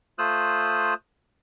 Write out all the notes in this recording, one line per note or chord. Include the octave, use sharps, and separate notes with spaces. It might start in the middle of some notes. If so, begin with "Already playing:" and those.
A3 F4 C5 D#6 E6 F#6